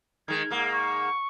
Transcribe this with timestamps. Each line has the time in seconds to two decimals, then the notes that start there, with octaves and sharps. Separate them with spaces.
0.28 D#3 G#3 G#6
0.51 G#2 A#3
0.72 C#6